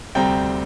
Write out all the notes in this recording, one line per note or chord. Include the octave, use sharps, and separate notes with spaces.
D2 C3 G3 C4 G5 A#5